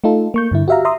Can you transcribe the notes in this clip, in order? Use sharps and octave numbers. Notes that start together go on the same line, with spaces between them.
A3 D#4 F4 A4
A#3 C#6 G6
G2 D3 E4
F#4 G4 E5 F5 A#5
E5 A#5 C6 D#6